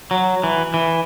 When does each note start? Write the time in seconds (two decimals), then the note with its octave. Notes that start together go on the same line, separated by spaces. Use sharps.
0.11 F#3
0.43 E3
0.74 E3